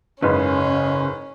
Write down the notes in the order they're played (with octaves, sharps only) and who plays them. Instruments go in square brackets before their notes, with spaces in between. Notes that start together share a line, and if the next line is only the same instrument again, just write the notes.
[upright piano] F#1 G#2 B4 [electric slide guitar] C#3 [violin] C#4